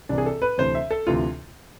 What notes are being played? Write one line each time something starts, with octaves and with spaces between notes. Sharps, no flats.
C2 C3 E3 D4
G#4
A4
B4
D2 C3 E3 C5
E5
A4
D2 C3 E3 F4